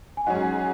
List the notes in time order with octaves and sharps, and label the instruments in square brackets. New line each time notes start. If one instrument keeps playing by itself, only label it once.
[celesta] G#5
[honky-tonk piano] G#2 F#3 C#4 G#4 [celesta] D#5 F#5